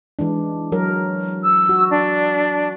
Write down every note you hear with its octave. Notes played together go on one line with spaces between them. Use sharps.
E3 G#3 D4
F#3 A#4
E6
F#4
D4